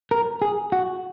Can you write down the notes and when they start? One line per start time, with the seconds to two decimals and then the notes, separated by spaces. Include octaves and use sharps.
0.11 A#4
0.42 G#4
0.72 F#4